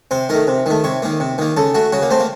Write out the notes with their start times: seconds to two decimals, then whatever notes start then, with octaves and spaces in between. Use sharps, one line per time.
0.11 C3 C5
0.29 D#3 A3 A#4
0.47 C3
0.66 D#3 A3
0.84 C3 C#5
1.02 D#3 A#3
1.20 C3
1.38 D#3 A#3
1.57 C#3 A4
1.75 A3 F#4
1.92 C#3 F#4
2.02 A#3
2.11 A3 C4
2.20 A#3